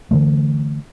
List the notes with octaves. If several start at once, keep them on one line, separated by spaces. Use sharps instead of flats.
D3 E3 A3